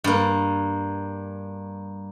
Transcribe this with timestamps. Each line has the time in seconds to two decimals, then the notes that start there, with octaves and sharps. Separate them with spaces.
0.04 G2 A#3